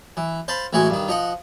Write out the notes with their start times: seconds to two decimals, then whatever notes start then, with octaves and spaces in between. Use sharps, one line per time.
0.17 E3
0.48 C5 F5 A5 B5
0.73 A1 E3 G#3 F#4 G#5
0.90 G2 D#3
1.08 F3 D#5 F#5